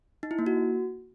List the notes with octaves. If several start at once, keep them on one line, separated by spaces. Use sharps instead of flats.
D#4
E4
A#3
F#4